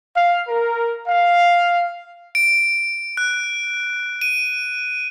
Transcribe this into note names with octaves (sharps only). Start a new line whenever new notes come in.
F5
A#4
F5
D7
F#6
D#7